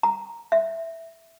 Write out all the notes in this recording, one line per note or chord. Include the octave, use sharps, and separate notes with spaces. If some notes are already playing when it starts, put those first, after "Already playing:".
A#5
E5